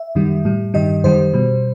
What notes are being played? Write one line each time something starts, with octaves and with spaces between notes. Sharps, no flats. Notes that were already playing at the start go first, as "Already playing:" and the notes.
Already playing: E5
F#2 D#3 G3
A2 G3
G2 D#3 G3 D#5
F#2 D#3 G3 C5
B2 G3